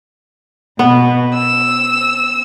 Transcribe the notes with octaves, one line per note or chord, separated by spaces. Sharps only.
B2 B3
E6